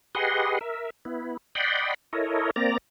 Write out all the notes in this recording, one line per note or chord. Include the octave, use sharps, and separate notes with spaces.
G4 G#4 B4 D#5 F#5 C6
A#4 E5
B3 E4
D5 D#5 F#5 G5 B5 C6
E4 A4 A#4 C#5 D#5
A#3 C4 D5 A#5